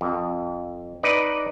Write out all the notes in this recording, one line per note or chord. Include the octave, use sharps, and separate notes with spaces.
F2
D#4 B4 D5